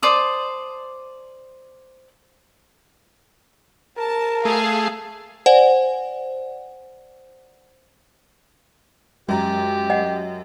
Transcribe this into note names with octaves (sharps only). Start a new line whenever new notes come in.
C5 D5 A5 D#6
A#4 A5
A3 G#4 F5 C7
C5 D5 F#5 G#5
F#2 G#3 G4 A#5
D#5 F#5